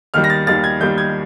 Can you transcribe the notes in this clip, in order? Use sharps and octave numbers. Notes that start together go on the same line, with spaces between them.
D#2 D#3 G3 F6
A#6
A6
D#2 D#3 G3 A6
G#6
D#2 D#3 G3 G6
G#6